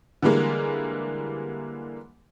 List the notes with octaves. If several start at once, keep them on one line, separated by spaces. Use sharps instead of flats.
D3 E3 G3 G#3 A#3